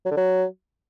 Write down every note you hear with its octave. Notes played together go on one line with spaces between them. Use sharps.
F#3
D3
F#3